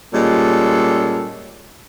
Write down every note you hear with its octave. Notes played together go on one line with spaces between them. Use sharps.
A#2 G3 G#3 C#4 A4